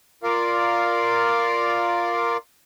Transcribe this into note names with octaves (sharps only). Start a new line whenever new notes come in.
F4 A#4 D5 F5